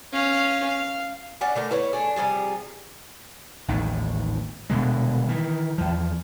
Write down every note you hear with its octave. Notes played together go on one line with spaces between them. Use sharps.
C#4 F5
F5
C#4 D4 F#5
D3 A3 A#4
E4 B4 C#5
A3 D4 G#4
C3 F3 G3 G#4
A1 D#2 G#2
D#1 B2 D3 G#3
D#3 E3
E2 F3